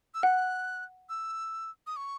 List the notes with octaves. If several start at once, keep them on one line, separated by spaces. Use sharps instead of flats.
E6
F#5 F#6
E6
D#6
C#6